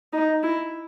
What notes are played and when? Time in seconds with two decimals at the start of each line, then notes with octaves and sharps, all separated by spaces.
0.13 D#4
0.43 E4